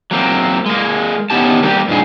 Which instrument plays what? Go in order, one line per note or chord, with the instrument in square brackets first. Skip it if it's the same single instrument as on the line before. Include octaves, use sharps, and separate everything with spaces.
[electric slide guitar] F#3 A#3 C4
G#3 A#3
D#3 B3 C#4 G4 A5
G3 A#3 C4 G4
G2 A#2 D#3 G#4